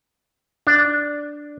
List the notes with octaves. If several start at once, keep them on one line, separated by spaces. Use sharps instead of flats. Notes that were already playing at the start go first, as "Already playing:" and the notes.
D4